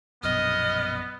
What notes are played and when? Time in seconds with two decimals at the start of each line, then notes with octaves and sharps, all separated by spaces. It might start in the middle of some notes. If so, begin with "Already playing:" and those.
0.23 A#1 F#2 B2 B3 D#5 F6